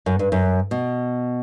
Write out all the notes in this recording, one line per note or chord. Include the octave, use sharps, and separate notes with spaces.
F#2
G2
F#2
B2